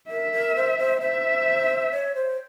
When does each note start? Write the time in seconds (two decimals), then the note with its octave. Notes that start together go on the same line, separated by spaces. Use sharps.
0.10 A#4 E5
0.33 A#4
0.56 C5
0.79 C5
1.01 C5 E5
1.92 C#5
2.15 C5